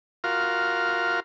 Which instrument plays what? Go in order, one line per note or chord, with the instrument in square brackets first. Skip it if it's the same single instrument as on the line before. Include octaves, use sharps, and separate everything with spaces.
[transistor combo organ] F4 F#4 A#4 F5